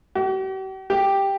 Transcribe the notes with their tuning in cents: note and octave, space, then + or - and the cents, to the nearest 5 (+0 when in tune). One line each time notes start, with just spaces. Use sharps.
G4 -45
G4 +5